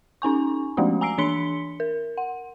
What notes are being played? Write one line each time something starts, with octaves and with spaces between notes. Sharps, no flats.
C#4 D#4 G#5 C#6
F3 G#3 A3 C#4 F#4
G#5 A#5 E6 C7 D7
E3 D4 C6 B6 C#7 G7
A#4
F#5